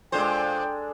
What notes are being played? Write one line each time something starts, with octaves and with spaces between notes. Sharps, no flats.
A#2 G#3 D4 A4 C5 G5